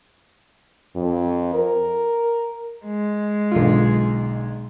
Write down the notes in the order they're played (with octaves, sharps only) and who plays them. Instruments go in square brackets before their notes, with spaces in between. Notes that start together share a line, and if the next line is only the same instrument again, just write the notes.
[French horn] F2
A#4
[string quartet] G#3
[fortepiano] B1 D3 F4